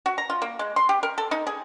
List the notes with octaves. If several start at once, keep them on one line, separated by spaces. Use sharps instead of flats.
F#4
A#5
F4
A#3
G#3
C6
G4
A#4
A4
D#4
G#4